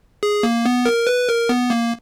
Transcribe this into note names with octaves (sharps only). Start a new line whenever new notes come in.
G#4
A#3
B3
A#4
B4
A#4
B3
A#3